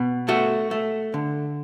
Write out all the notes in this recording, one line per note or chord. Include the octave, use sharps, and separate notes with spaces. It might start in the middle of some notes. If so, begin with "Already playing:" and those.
Already playing: B2
A3 F#4
A3
D3